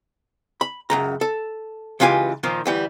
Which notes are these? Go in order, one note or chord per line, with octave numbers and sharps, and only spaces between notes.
B5
C#2 F#2 A#5
A4
C#2 E3 F4 G4 G#5
A#2 D#3 F3
D2 E3 G3